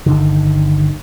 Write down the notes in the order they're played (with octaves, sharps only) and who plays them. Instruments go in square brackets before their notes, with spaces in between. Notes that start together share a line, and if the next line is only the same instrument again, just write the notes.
[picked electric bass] G1 D3 D#3